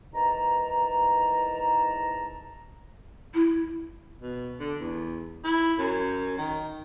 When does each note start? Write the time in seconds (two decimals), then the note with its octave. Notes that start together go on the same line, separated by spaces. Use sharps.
0.14 E2 G#2 D#3 E3 A5 A#5
3.34 E4
4.22 B2
4.60 D3
4.80 E2
5.44 E4
5.79 F#2
6.38 D#3